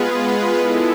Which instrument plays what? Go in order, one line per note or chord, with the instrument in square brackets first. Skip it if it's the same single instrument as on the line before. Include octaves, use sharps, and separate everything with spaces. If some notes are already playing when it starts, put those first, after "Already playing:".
Already playing: [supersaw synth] G#3 B3 F4 G#4 B4
G#3 B3 E4 A4